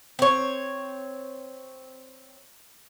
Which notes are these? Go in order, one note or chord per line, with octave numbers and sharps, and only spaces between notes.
C4 C#5